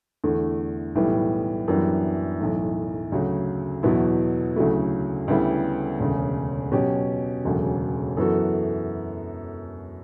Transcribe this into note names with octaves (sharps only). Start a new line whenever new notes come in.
E2 D3 A3
B1 A2 E3 G3 B3
F#2 E3 G3 B3 D4
B1 A2 E3
D2 C#3 F#3
E2 B2 F#3 B3 E4
D2 C#3 F#3 A3 E4
D2 C#3 G3 B3 E4
E1 D2 C#3
B2 F#3 C#4 G4
E1 D2 C#3 F#3
F#2 E3 B3 F#4 A4